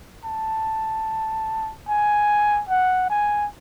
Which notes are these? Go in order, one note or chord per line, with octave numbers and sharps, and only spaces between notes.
A5
G#5
F#5
G#5